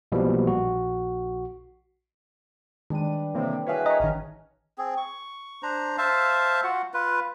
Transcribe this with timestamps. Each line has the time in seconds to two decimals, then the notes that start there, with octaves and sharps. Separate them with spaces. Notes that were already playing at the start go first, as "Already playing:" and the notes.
0.12 B1 B2 E3 F3 G3 A#3
0.47 A#1 F#4
2.90 D#3 G3 G#3 D4 B4 D#7
3.34 A2 C3 E3 A#3 C4
3.67 E4 F#4 G#4 A#4 B4 C#5 F5
3.86 C#5 D#5 E5 A#5
4.00 A1 D#3 C#4
4.78 C4 G#4
4.97 C#6
5.63 D4 C5 A#5
5.98 C5 E5 F5 A5
6.64 F4 F#4 F#5
6.94 F4 B4